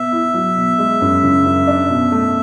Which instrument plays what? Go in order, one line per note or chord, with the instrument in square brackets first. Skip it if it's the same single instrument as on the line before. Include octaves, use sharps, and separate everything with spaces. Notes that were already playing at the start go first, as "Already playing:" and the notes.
Already playing: [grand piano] B2 B3 [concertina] E5
[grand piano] E4
F#3
B2
G#3
F#2
C#3
F#2
D4
B2
A3